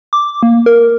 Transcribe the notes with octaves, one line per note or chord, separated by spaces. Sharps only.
D6
A#3
A#4